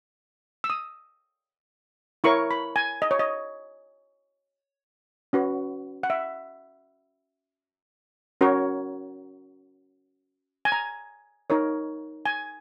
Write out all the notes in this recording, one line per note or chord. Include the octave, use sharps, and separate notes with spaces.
E6
D#6
E4 A#4 C#5 C#6
B5
G#5
D#5
C#5
D#5
C#4 F#4 B4
F#5
E5
C#4 F#4 A#4 C#5
G#5
A#5
D#4 A#4 C#5
G#5